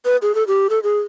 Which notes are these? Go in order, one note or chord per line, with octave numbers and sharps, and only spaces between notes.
B4
G#4
A4
G4
A4
G#4